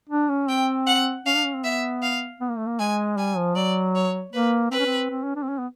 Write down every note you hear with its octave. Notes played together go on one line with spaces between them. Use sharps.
D4
C#4
C4 G5
F#5
C#4 F5
D4
C#4
C4
B3 E5
F5
B3
A#3
A3
A#3
G#3 G#5
G3 G#5
F3
F#3 D5
C#5
A#3 B4
C4 B4
C#4
C4
C4
C#4
D4
C4
C#4
B3